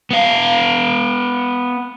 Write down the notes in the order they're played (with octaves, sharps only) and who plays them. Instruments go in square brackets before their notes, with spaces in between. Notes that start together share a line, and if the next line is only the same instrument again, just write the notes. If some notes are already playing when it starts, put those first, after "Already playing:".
[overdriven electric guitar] B3 F5